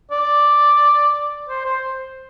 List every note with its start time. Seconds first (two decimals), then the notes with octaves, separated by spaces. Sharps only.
0.11 D5
1.49 C5
1.66 C5